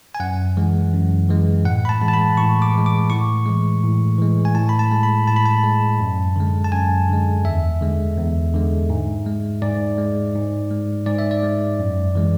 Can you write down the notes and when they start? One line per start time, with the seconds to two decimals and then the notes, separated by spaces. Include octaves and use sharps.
0.15 G#5
0.20 F#2 F#5
0.57 E3 G#3
0.93 F#2
1.29 E3 G#3
1.65 A2 F#5
1.85 B5
1.89 A5
2.01 E3 G#3
2.08 A5
2.13 B5
2.37 A2 C#6
2.62 D6
2.74 E3 G#3
2.86 D6
3.10 A2 C#6
3.46 E3 G#3
3.83 A2
4.19 E3 G#3
4.45 G#5
4.55 A2 A5
4.69 B5
4.79 A5
4.91 G#3
5.03 B5
5.27 A2 A5
5.36 B5
5.46 A5
5.63 G#3
6.00 F#2
6.36 D3 G#3
6.64 A5
6.72 F#2 G#5
7.09 D3 G#3
7.45 E2 E5
7.81 D3 G#3
8.17 E2
8.54 D3 G#3
8.90 G#2
9.26 G#3
9.62 G#2 D5
9.98 G#3
10.35 G#2
10.71 G#3
11.06 G#2 D5
11.18 E5
11.31 D5
11.43 G#3
11.79 F#2
12.15 E3 G#3